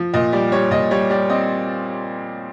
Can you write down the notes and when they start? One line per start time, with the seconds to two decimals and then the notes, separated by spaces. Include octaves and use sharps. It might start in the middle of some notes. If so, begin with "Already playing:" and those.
Already playing: F3
0.13 A#2 D#5
0.33 G3 D5
0.52 G3 C#5
0.71 A#2 D#5
0.91 G3 C#5
1.10 G3 D5
1.30 C4 D#5